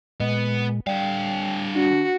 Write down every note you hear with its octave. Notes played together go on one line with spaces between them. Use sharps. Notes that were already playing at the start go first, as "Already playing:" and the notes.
A#2 G#3 B3
D3 G3 F5 G5
D4 F#4